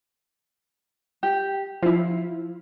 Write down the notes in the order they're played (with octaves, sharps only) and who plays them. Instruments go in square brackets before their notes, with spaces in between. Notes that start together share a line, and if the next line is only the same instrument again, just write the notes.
[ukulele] G4
[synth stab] F3 E4 [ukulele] F4